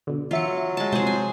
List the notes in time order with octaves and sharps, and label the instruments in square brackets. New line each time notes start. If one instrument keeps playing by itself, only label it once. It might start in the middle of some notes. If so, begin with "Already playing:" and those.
[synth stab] B2 D3
[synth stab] E2 E5 C#7 [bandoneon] F#3 [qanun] F4
[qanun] G#3 A5
[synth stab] C3 F3 [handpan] G#3 [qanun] G#4 C5
[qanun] G#5